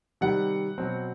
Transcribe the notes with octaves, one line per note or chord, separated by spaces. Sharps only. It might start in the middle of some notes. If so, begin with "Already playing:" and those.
C3 D#3 G3 F#5
B2 F#3 C4